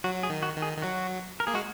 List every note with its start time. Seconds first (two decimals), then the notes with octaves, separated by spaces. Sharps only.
0.04 F#3 F#4
0.23 G#4
0.30 D#3
0.43 F#4
0.56 D#3
0.62 G#4
0.78 D#3
0.82 F#3 F#4
1.40 A#4
1.47 A#3 G#4
1.54 G#3 F#4